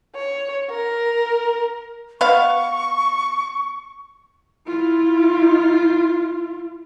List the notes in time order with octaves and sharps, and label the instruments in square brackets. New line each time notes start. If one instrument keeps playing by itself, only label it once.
[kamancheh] C#5
A#4
[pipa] B3 F5 [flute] C#6
[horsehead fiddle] E4 F4